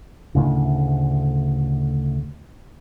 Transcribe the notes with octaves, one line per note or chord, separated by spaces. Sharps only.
D2 A2 C#3